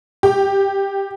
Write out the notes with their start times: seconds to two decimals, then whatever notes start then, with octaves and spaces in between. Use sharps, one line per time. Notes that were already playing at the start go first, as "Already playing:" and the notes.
0.23 G4